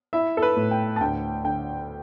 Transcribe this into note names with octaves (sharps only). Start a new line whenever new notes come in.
E4 E5
A4
B4
A2
G5
A5
D2 G5
D3 G5